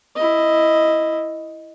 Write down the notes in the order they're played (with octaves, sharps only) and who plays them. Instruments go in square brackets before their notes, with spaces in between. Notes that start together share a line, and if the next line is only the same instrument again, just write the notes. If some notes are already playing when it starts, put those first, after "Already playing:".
[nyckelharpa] E4 D#5